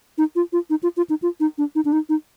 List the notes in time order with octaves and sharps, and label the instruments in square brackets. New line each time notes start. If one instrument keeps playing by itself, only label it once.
[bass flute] D#4
F4
F4
D#4
F4
F4
D#4
F4
D#4
D4
D#4
D4
D#4
D#4